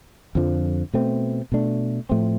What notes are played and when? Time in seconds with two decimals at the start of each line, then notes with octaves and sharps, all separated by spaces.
0.35 F2 D3 F3
0.94 B2 A3 C4
1.52 B2 A3 D4
2.09 A2 F3 A3 C4